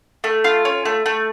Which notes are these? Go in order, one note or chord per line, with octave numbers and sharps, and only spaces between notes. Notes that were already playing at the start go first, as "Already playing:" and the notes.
A3
F4
C#4
A3
A3